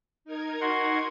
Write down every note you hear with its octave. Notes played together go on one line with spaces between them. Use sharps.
D#4 A#4 G#6
F#4 F#5 C6